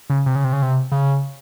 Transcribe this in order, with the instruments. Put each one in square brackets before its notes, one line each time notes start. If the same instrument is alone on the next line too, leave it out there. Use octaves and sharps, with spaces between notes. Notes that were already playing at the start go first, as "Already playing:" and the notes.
[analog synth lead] C#3
C3
C#3
C3
C#3
C3
C#3